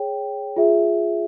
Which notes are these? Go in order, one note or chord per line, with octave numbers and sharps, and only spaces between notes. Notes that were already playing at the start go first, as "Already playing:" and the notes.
Already playing: G#4 C#5 G5
F4 G#4 E5